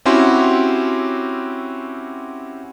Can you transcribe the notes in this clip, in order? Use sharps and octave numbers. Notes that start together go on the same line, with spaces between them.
C4 C#4 E4 F#4 G4 C6